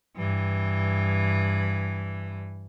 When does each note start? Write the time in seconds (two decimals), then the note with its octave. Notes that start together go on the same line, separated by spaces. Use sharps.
0.17 G2 E3